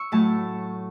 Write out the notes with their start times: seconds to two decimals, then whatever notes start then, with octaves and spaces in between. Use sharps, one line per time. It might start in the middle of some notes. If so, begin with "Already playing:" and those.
Already playing: C#6 E6
0.12 A2 F#3 A3 A5